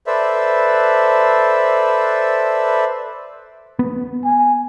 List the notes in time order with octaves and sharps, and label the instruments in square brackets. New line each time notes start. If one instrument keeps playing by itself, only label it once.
[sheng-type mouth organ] A4 B4 C5 D5 E5
[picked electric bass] B3
[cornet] G#5